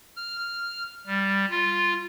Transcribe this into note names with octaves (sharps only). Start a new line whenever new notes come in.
F6
G3
F4